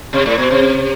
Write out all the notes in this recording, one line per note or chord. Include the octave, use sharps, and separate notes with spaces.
C3
A2
B2
C3